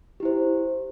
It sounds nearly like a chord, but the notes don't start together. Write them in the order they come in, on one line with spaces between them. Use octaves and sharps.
G4 E4 C5